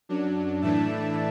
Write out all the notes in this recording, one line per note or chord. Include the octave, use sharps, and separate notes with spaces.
F#2 F#3 D4
A2 E3 A3 D4 E5 A5